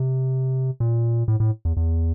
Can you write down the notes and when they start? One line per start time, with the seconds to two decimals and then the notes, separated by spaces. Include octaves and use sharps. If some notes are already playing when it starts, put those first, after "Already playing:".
Already playing: C3
0.80 A#2
1.28 A2
1.40 A2
1.65 E2
1.77 E2